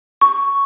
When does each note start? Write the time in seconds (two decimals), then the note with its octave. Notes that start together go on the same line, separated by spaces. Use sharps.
0.21 C#6